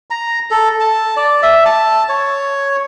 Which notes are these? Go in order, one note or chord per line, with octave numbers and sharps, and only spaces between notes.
A#5
A4
A5
D5
E5
A5
C#5